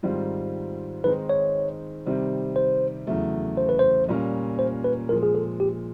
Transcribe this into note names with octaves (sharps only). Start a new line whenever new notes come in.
G#2 D#3 G3 C4 F4
D#3 G#3 C4 D#4 B4
C#5
C3 D#3 G3 C4
C5
E2 C#3 F#3 A3
C5
B4
C5
A#2 G3 A#3 C#4 F4
C5
B4
A#2 F3 G#3 A#4
G#4
A4
G4